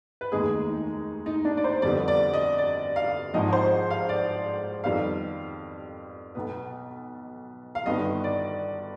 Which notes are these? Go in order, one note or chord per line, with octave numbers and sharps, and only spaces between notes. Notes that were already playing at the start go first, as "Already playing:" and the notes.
B4
F1 D#2 D#3 G#3 B3 G#4
D#4
D#4
D4
D5
C5
F2 D3 G3 B3 D5
D5
D#5
D5
F5
G#1 G#2 F3 G#3 D#5
C5
F5
D5
F2 D#3 G3 B3 F5
B1 B2 B3
F5
G1 G2 D#3 G3 B3 D#5
D5